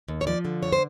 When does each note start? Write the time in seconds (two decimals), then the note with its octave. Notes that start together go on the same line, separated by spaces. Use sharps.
0.08 D#2
0.21 C#5
0.27 F3 D5
0.45 D3
0.63 F2 C#5
0.73 C5